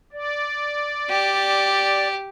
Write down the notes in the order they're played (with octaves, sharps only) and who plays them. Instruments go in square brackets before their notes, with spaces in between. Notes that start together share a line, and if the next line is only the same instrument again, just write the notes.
[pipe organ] D5
[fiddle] G4